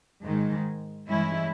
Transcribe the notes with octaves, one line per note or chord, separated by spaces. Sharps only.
G#2 D#3 G#3
G2 E3 G#3 C#4 E4